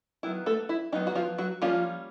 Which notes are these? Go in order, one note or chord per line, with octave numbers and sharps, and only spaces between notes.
D#3 F#3 B3 E4
A3 A4
E4
D#3 F#3 B3 D#4
F#4
F3 F4
F#3 F#4
F3 G3 A#3 C#4 F4